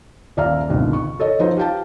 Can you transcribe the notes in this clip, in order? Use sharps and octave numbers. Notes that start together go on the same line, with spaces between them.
D#1 D5 E5 F5 A#5 F6
G#1 C#2 B2 D3 D#3
C#6
A4 C#5 D#5
F3 D#4 F#4 B4 C5
G4 F5 G5 A5